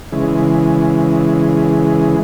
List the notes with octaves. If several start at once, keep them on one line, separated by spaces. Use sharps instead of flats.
C#3 E3 G#3